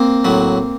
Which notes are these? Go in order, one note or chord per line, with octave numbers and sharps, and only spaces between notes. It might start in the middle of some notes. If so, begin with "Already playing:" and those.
Already playing: A#3 C4
A2 F#3